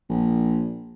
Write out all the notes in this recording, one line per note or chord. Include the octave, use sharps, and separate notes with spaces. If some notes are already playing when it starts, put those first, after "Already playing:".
A#1